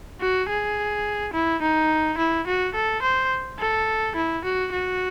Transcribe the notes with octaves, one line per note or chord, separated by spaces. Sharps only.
F#4
G#4
E4
D#4
E4
F#4
A4
C5
A4
E4
F#4
F#4